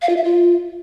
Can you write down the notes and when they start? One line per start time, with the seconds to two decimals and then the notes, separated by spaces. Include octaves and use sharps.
0.02 F5
0.09 F4
0.17 E5
0.24 F4